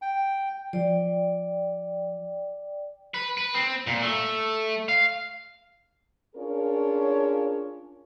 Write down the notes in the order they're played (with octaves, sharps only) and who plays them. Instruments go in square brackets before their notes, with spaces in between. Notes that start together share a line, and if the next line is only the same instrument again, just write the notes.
[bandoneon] G5
[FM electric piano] F3 [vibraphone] D5 G5
[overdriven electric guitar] B4
B4
C4
A#2
A3
F5
[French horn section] C#4 D4 F4 G#4 A#4 C#5